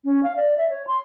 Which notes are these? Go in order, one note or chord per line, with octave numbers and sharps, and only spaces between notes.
C#4
F5
D5
E5
C#5
C6